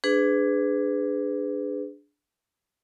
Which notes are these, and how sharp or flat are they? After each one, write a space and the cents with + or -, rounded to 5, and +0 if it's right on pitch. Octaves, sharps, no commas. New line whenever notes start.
D4 +0 G#4 +0 B4 +30